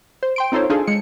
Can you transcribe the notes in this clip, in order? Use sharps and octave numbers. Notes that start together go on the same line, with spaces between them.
C5
G5 C6 D7
C4 D#4 F4 A4 C5 C#5
D4 D#4 F4 G#4 A4
G#3 C#7